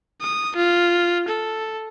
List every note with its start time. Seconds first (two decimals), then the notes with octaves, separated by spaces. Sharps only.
0.22 D#6
0.56 F4
1.29 A4